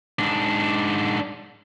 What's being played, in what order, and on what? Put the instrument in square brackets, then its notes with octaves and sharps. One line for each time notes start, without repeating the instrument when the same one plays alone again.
[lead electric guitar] G#2 D4